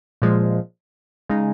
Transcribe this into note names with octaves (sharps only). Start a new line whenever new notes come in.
A#2 F3 G#3
C#3 G#3 D#4